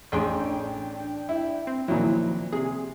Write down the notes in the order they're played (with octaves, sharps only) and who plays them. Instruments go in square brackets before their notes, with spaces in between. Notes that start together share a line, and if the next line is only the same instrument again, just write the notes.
[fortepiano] A1 G#4 C6 [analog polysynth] D4 G5
[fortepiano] E4
[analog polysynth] C4
[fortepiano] A#2 F#3 [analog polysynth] D#3 F3 E4
[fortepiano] C3 [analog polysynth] G#4